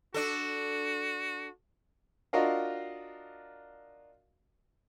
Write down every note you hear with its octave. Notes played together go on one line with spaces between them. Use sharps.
D4 F#4 A4
D4 F4 F#4 A#4 D#5 F5